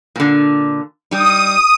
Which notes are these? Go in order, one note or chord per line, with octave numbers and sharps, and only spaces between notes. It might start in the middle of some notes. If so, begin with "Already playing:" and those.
A#2 D3
G3 D#4 D#6